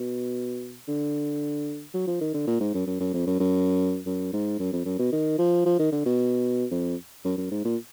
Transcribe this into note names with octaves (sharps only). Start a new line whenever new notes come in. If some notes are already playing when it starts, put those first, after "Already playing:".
Already playing: B2
D3
F#3
F3
D#3
D3
A#2
G#2
F#2
F#2
F#2
F2
F#2
F#2
F#2
G#2
F#2
F2
F#2
B2
D#3
F3
F3
D#3
D3
B2
F2
F#2
F#2
G#2
A#2